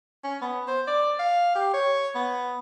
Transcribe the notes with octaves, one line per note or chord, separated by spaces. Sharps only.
C#4
B3
C5
D5
F5
G4
C#5
B3